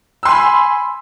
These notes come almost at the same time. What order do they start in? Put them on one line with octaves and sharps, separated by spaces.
E6 C6 G#5 B5